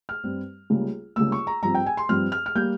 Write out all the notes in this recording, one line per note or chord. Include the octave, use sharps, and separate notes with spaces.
F6
G2 G3 C4
C#2 C#3 G3 A#3
C#2 C#3 G3 A#3 E6
C#6
A#5
G2 F3 C4 A#5
G5
G#5
C6
G2 F3 C4 F6
F6
F6
G3 A#3 G6